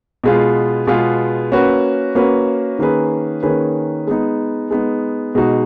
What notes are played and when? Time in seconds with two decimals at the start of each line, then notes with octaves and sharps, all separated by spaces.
0.24 B2 G#3 B3 F4 G#4
0.87 B2 G#3 B3 F4 G#4
1.52 A#3 C#4 F#4 B4
2.15 A#3 C#4 F#4 B4
2.79 D#3 A#3 C#4 G#4 B4
3.43 D#3 A#3 C#4 G#4 B4
4.07 G#3 B3 D#4
4.71 G#3 B3 D#4
5.35 B2 G#3 D#4 F#4